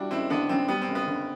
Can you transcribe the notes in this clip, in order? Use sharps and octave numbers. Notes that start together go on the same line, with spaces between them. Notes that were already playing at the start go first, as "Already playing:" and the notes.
Already playing: G3 D4 E4 F#4
F#1 C4 E4
D3 B3 D4
F#2 C4
G3 B3
C4
F#1
B3
D3